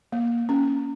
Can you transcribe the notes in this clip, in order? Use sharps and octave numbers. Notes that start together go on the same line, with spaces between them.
A#3
C#4